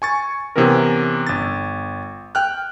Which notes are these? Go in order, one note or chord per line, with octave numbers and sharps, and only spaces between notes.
G#5 C#6 A6
C3 E3 B3 C#4 A#4
G1 A6
G5 F6 F#6